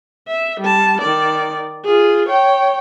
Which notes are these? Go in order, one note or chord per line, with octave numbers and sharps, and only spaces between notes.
E5
G3 A5
D#3 D5
F4 G#4
C#5 G5